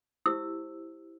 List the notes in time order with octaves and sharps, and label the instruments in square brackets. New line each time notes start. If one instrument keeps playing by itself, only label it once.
[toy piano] E4 G4 C5 E6